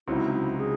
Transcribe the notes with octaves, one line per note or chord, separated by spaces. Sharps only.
C#2 C3 F#3 C4 D#4 E4
E4
F#4
G#4